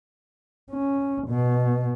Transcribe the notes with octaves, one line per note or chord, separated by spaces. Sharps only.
C#4
B2